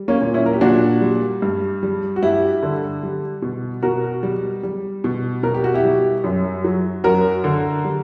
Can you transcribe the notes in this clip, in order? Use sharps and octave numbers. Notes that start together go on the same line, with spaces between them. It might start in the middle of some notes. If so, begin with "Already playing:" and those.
Already playing: G3
A#3 C#4
A#2
C#4 E4
A#4
G4
A#2 D4 F#4
G3
G2
G3
F#4
G2 E4 G4
D3
G3
B2
B2 F#4 A#4
G3
G3
B2
B2 A#4
G4
F#4
E4 G4
G3
F#2
F#3
F#2 F#4 A#4
D3
G3